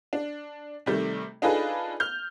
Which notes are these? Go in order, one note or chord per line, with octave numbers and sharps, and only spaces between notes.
D4
C3 D#3 G3 A3
D4 D#4 F4 G#4 A4 B4
F6 G6